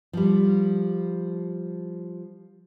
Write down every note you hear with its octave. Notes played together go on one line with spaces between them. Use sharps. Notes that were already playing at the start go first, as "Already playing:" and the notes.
F3 G3